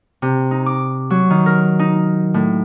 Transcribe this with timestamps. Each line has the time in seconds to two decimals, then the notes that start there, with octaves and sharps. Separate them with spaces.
0.22 C3
0.51 D#4
0.66 D6
1.10 F#3
1.30 D#3
1.46 A#4
1.79 D#4
2.34 A2